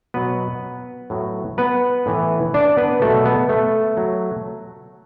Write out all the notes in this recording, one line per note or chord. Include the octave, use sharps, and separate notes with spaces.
B2 F#3 B3 B4
A2 F#3
B3 B4
A2 E3
D4 D5
B3 B4
B2 F#3 A3 A4
B3
A3
F#3